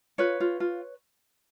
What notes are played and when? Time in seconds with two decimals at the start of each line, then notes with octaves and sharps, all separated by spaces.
0.18 F4 B4 C#5
0.40 F4
0.60 F4